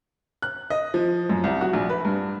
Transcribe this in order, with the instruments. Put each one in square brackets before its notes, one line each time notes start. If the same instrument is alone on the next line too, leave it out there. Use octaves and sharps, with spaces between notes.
[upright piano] F#6
D#5
F3
F#2
C2
F#4
A#1
B4
G2